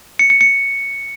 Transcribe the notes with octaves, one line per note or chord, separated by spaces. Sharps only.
C#7
C#7
C#7